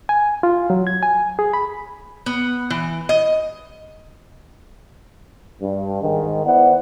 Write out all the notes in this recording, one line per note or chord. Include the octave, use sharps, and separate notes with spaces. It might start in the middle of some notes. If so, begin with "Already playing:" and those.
G#5
F4
F#3
G#6
G#5
G#4
B5
B3
E3
D#5
G2
G#2 D#3
B3 E4 C5 D5 F#5